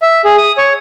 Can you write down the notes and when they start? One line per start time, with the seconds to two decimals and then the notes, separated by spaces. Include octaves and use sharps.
0.02 E5
0.24 G#4
0.38 D#6
0.58 C#5